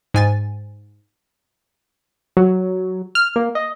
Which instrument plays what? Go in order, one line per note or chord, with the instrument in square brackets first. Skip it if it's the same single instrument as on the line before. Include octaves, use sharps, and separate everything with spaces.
[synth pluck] G#2 G#5 A6
[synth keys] F#3
F6
A#3
D#5